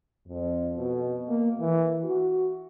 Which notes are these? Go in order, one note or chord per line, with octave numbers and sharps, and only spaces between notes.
F2
B2
A#3
E3
F#4